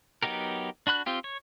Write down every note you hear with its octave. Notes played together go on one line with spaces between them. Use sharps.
F#3 B3 D#4 G4 A#4
D4 F#4 B5 F#6
C4 F4 G4
C#5